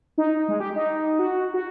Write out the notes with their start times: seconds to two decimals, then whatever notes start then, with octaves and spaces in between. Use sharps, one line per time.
0.18 D#4
0.48 G#3
0.60 G4
0.75 D#4
1.19 F#4
1.54 F#4